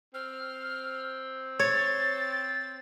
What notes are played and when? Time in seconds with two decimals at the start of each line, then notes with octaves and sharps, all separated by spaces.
0.14 C4 F6
1.59 C#5 A6